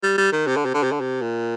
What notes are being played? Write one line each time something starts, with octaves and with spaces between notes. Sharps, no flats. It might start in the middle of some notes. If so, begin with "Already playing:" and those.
G3
G3
D#3
C3
D3
C3
D3
C3
D3
C3
A#2